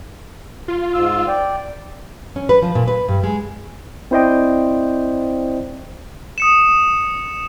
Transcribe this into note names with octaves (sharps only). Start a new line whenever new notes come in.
F4
G#2 E6
D5 G5
C#4
B4
F3
A#2
B4
G2
G#3
C4 E4 C5 D5 D#5 G5
D#6 C#7 E7